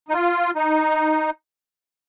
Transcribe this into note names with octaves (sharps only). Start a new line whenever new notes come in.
D#4
F4
D#4